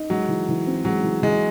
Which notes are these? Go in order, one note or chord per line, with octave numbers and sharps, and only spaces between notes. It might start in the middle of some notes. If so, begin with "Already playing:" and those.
Already playing: D#4
F#3 G#3
E3
E3
C4
F#3 G#3
E3
E3 G#3